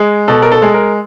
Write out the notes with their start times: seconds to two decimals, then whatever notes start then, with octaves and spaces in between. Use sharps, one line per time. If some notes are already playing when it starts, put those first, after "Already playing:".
Already playing: G#3
0.28 B2 A4
0.42 A#4
0.52 A4
0.62 G#3
0.74 A#4